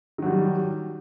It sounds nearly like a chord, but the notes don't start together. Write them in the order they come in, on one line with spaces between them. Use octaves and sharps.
D#3 F#3 G3